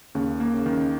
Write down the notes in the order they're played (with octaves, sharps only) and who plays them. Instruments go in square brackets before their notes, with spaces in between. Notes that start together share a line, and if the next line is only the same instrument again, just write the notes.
[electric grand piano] D#2 [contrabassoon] C#3
[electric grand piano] A#3
[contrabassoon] C#3
[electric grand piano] D#3